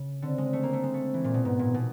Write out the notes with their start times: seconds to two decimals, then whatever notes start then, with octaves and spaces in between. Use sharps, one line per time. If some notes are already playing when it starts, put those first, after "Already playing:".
Already playing: C#3
0.22 D3 C4
0.38 G#3
0.53 A3
0.63 A#3
0.73 A3
0.83 G#3
0.94 A3
1.14 E3
1.24 A#2
1.34 B2
1.45 G#2 B3
1.59 A#2
1.74 B2